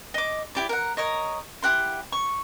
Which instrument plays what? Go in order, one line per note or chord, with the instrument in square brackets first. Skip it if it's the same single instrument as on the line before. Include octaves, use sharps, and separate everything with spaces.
[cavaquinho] D#5 D6
E4 G4 D5
A#4 F#5
A#4 C#5 D#5
E4 G4 F#5 C6
C#6